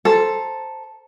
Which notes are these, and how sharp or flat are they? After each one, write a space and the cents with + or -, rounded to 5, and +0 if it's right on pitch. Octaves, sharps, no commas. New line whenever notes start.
A4 +0 C5 +0 A#5 +0